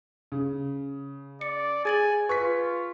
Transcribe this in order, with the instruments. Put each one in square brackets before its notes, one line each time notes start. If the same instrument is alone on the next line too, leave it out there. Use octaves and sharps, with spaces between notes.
[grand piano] C#3
[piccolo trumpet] D5 [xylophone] C#7
[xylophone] G#4 A6 F#7 [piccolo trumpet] G#5
[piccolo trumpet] F4 [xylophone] B4 [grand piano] C#6 B6